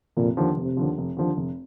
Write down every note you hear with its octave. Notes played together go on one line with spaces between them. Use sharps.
F1 A#2
D#2 D3 F3
F1 C3
D#2 D3 F3
F1
D#2 D3 F3
F1